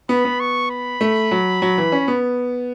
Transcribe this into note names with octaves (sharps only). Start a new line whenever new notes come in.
B3 B5
B3
C#6
B5
A3
F#3
F#3
E3
C#4
B3